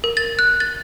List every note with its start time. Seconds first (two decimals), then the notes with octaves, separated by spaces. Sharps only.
0.04 A#4
0.17 A6
0.39 F#6
0.60 A6